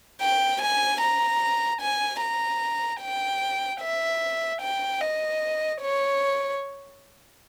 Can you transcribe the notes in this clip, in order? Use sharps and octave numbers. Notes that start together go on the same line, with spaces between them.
G5
G#5
A#5
G#5
A#5
G5
E5
G5
D#5
C#5